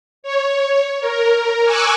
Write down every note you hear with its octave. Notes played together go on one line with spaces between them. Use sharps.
C#5
A#4
G#5 C#6 D6 E6 F#6